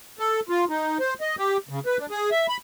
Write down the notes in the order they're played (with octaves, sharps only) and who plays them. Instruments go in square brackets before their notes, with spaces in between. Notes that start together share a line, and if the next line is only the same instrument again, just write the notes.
[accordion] A4
F4
D#4
C5
D#5
G4
C#3
B4
D4
G#4
E5
B5